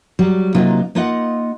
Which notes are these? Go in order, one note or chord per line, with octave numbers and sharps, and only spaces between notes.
F#3 G3
C3 F#3 A#3 D#4 F4
A#3 D#4 F4 D#5 F#5